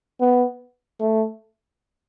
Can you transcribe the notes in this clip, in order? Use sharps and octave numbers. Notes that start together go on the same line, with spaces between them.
B3
A3